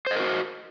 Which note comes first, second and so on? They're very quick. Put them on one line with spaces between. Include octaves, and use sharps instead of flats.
C5 D#5 A#4 F#4